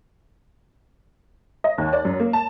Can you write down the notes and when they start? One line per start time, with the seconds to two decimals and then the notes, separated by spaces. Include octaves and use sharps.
1.64 D#5
1.78 D#2
1.93 D5
2.05 F#2
2.20 A#3
2.33 A5